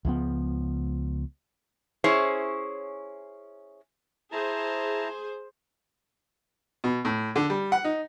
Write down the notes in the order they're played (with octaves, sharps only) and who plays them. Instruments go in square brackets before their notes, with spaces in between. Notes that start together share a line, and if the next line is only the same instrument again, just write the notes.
[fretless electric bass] C#2 F3 B3
[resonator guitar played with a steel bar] C#4 E4 G#4 C5 C#5
[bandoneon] E4 A5 A#5 [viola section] G#4 C5
[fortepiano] B2
A2
D3
G3
F#5
D#4